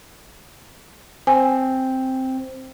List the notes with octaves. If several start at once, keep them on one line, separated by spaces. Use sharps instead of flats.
C4 G#5